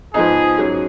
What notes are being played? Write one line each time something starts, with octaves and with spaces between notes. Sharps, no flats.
G#2 F3 B3 D#4 G#4
G#2 F#3 C#4